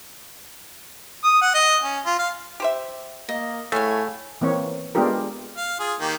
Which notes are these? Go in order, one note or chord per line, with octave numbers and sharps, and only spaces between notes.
D#6
F#5
D#5
C#4
F4
F5
G4 C5 E5
A#3 D#5
A2 A3 G#4 C#5 F5 G#5
E3 A#3 C4 C#5
G#3 B3 D4 F4 G4 A#4
F5
F4 G#4
D#3 A#3 G4